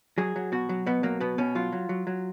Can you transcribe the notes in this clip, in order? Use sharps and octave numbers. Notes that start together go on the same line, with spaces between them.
F#3 G#4
F#3
B2 F#4
F#3
B2 B3
F#3 A#3
B2 B3
B2 C#4
F#3 F4
F#3
F#3
F#3